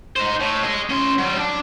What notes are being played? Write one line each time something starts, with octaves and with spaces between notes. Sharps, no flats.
D#4 C5
A2
G#4 D#5
C#4 C6
F#3 G3
D4